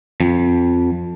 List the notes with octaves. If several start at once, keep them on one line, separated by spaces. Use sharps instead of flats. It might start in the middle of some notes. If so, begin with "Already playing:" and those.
F2